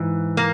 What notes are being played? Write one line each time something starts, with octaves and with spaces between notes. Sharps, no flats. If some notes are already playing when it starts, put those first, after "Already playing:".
Already playing: G#2 E3
A#3